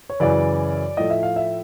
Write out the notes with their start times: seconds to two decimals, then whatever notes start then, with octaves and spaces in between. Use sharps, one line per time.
0.10 C#5
0.20 F#2 C#3 E3 D5
0.97 A2 F3 A3 D#5
1.10 E5
1.23 F5
1.36 E5